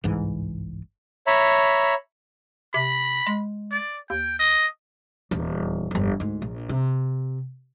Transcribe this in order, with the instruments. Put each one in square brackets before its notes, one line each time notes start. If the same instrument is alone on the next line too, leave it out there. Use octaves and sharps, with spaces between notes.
[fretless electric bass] G1 C2 G#2 E3
[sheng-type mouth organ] C#5 E5 A#5 B5
[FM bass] C3 [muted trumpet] B5
[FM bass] G#3
[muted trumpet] D5
[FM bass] D#2 [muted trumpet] G5
[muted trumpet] D#5
[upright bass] D#1 E2
G1 F2
D2 G#2
A#1
C3